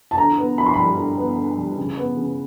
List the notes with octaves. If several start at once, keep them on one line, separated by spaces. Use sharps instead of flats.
A5
D3 A#5
B3
D3 B5
C6
G3 B5
D3
B3
D3
G3
C#3
B3
C#3